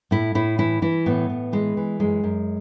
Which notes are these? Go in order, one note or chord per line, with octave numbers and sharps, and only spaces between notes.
A2 E4
A2 E4
E3 E4
E3 E4
A2 B3
A2
E3 G#3
E3
F#2 G#3
F#2